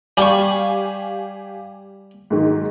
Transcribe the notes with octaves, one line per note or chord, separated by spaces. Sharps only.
G3 G4 F5 G#5 C#6
G#2 D#3 F#3